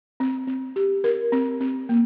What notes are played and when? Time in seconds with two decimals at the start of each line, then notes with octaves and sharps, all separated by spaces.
0.20 C4
0.47 C4
0.76 G4
1.04 A#4
1.32 C4
1.60 C4
1.89 A#3